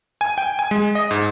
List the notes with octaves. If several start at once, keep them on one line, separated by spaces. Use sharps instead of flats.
G#5
G5
G#5
G#3
D#5
G#2